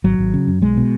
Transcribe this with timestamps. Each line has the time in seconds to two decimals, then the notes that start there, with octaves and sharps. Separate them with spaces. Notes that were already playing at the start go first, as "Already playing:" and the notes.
0.04 G#1 F#3
0.19 G#1
0.34 C#3
0.47 F#2
0.62 B1 G#3
0.77 B2